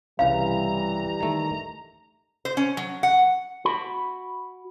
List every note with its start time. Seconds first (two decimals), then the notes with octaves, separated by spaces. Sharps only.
0.19 C2 C#3 E3 G3 F5 A#5
1.20 D#3 A3
2.45 C5
2.57 C#4
2.77 F#3
3.03 F#5
3.65 F#4 B5